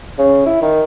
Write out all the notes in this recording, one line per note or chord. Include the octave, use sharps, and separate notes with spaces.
C#3
E4
D#3